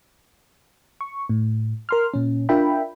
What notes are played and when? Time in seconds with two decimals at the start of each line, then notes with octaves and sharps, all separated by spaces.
1.01 C#6
1.29 A2
1.89 A#4 C6 F6
2.14 A#2 C#4
2.49 D4 F4 A#4 E5 G5 B5